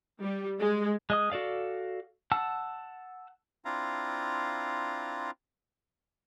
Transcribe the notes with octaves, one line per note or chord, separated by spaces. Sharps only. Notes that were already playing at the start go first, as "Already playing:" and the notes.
G3
G#3
G#3 D#5 D#6
F#4 A4 D5 F5
F#5 A5 E6
C4 D4 E4 F4 F5 A#5